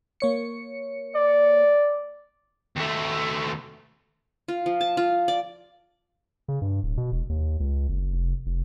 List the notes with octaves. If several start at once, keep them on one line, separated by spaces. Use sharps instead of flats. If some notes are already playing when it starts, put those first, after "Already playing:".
A#3 C#5 C#7
D5
D#2 A3
F4
F3
A5
F4
D5
C#3
G2
D1
B2
E1
D#2
C#2
F#1
F1
F1